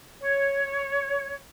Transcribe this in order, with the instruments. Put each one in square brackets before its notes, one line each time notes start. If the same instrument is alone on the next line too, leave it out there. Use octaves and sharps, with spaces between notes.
[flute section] C#5